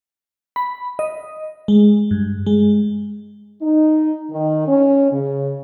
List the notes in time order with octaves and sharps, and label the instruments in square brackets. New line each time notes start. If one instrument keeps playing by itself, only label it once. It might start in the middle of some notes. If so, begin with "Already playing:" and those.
[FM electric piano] B5
D#5
G#3
G2
G#3
[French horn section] D#4
D#3
C#4
C#3